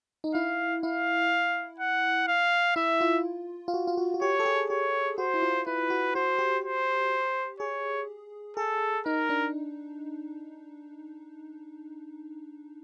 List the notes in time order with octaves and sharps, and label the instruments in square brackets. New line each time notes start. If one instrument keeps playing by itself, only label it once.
[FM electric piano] D#4
[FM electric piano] E4 [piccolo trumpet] F5
[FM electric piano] E4 [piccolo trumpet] F5
[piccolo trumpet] F#5
F5
[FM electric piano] E4 [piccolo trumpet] E5
[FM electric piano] F4
F4
F#4
F4
F#4
F#4
[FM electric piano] G4 [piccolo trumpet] C#5
[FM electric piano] A4
G#4
[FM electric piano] G4 [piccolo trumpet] C#5
[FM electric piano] F#4 [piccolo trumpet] C5
[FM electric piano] E4
F4
[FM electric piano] E4 [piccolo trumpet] B4
[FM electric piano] F#4
[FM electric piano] F#4 [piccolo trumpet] C5
[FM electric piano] G4
[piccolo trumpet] C5
[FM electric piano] G#4 [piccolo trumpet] C#5
[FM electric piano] G#4 [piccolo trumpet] A4
[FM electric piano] D#4 [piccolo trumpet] A#4
[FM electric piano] D4